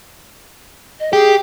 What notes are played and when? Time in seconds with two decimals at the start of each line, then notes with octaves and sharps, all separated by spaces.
1.00 D#5
1.13 G4 G#4